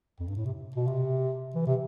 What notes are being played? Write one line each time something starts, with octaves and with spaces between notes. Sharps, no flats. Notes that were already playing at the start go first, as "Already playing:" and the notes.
F2
G2
A2
C3
B2
C3
E3
C3